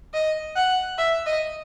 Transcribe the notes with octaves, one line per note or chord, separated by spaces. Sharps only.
D#5
F#5
E5
D#5